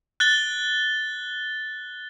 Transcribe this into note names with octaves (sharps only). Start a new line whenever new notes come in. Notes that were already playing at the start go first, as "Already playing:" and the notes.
F#6 A6 G7